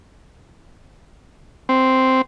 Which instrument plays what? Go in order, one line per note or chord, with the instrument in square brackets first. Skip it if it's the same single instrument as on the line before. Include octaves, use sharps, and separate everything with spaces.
[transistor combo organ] C4